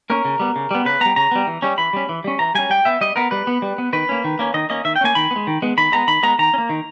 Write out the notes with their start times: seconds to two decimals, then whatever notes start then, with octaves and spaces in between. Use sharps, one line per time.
0.10 A#3 C#4 A#4
0.25 C#3
0.39 G3 B3
0.56 C#3
0.71 G3 B3
0.86 C#3 B4
1.01 G3 B3 A#5
1.16 C#3 A#5
1.31 G3 B3
1.47 E3
1.62 G3 C#4
1.78 E3 B5
1.93 G3 C#4
2.09 E3
2.24 G3 C#4
2.39 E3 A#5
2.55 G3 C#4 G#5
2.70 G3 G5
2.85 B3 E5
3.01 G3 D#5
3.16 B3 A#4
3.31 G3 B4
3.47 B3
3.62 G3
3.78 B3
3.93 D#3 B4
4.09 A#3 C#4
4.24 D#3
4.39 A#3 C#4
4.54 D#3 D#5
4.70 A#3 C#4 D#5
4.85 D#3 E5
4.96 G5
5.01 A#3 C#4 G#5
5.15 D#3 B5
5.31 B3
5.36 G#3
5.47 D#3
5.62 G#3 B3
5.78 D#3 B5
5.92 G#3 B3 A#5
6.08 D#3 B5
6.23 G#3 B3 A#5
6.39 D#3 A#5
6.54 C#4
6.58 A#3
6.69 D#3